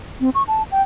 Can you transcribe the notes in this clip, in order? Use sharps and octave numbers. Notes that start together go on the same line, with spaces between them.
C4
C#6
A5
G5